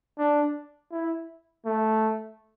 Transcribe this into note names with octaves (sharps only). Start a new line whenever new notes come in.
D4
E4
A3